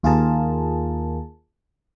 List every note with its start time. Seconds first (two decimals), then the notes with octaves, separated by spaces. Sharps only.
0.03 D#2 F4 G#4 A#4 A5